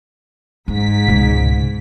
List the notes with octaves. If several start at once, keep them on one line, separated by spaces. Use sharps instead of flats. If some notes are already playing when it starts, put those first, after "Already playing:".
G#2 D#4 B6
C#2 B2